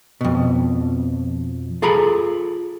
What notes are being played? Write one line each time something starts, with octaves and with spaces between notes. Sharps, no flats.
F2 B2
F4 G#4 A4 A#5 B5